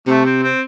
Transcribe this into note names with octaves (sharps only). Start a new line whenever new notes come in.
C3 A3
C4
C4